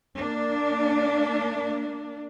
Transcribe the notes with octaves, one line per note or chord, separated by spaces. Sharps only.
A#3 D4